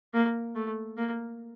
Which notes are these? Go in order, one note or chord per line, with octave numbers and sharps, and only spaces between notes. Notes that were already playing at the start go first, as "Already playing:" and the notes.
A#3
A3
A#3